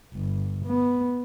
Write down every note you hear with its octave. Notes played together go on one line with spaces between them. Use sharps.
G1
B3